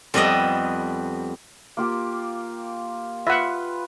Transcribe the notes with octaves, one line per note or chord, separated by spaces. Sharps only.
F2 G3 B3 B4 D#5 E5
A#3 F4 G4
F4 B4 E5 F#5